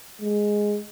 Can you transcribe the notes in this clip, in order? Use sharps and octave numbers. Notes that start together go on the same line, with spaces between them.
G#3